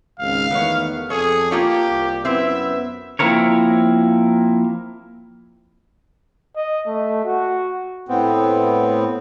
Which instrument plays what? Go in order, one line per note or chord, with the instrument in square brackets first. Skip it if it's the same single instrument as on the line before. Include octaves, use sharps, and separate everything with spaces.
[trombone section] G#1 C#2 [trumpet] F5
[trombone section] E2 D#3 A3 [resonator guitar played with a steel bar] B3 C#5
[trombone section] F2 A4 [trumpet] G#4 [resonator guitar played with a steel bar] C#5
[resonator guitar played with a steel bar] A#3 F4 C#5 [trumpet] G4
[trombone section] C2
[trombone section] F#2 B3 [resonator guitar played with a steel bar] C4 E4 [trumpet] E5
[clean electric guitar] F3 A#3 C4 E4 A#4 C#5
[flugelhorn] D#5
A3
F#4
[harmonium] A2 B3 C4